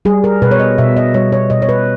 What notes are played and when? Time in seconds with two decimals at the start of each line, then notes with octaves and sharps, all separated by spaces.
0.05 G3 G#4
0.24 A#4
0.42 B2 B4
0.51 C#5
0.60 D#5
0.78 B2 E5
0.96 D#5
1.14 G3 C#5
1.32 C#5
1.50 B2 D#5
1.62 C#5
1.69 B4